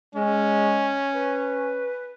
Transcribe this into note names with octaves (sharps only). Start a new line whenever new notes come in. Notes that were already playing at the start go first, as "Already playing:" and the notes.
G#3 C#4
B4